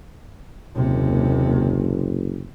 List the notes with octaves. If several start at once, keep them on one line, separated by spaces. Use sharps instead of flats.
F#1 D#2 C3